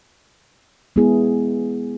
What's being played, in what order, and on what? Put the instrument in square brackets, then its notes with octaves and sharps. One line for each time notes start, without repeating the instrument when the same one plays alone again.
[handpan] G#3 B3 E4 G#4